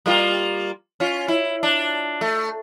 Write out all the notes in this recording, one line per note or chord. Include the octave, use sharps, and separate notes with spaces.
G3 A#3 F4
C#4 F4
E4
D4
A3